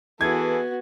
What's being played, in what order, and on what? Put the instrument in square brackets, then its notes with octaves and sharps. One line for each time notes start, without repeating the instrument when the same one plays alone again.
[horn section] E3 G#4 A4 [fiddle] B3 F#4 [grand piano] G#6